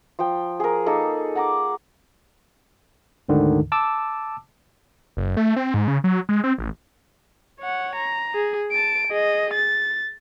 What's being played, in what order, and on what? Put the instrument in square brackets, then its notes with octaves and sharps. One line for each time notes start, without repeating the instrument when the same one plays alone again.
[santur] F3 G5
G#4 A#4
A#3 D#4 G#4 A4
F#5 A#5 D6
[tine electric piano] D2 G#2 D3 D#3
A5 D6 E6
[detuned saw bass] F#1
A3
C4
G#2
C#3
F#3
G#3
C4
A1
[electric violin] C#5 F#5
A#5
G#4
A5 D7
G#4 D#5
A6